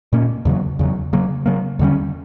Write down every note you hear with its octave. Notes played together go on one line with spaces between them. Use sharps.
A#2 A#3 C#4
E2 C#3 F#3
E2 C#3 F#3
C#3 F#3 A#3
C#3 F#3 A#3
E2 D3 G3 C#4